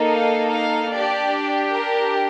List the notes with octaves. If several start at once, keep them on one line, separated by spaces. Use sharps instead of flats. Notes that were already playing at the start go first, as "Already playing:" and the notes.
Already playing: A#3 D#4 A4
F5
F5
D4 G4 D5
A#4